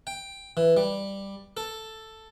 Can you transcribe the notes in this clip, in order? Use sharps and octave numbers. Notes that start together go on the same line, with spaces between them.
G5
E3
G3
A4